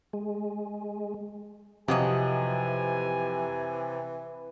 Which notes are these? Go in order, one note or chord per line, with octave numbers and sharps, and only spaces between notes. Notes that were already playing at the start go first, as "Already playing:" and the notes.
G#3
F2 C3 E3 F#3 D#5 G#5